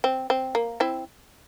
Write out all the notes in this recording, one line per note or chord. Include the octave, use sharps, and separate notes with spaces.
C4
C4
A#3
C4 E4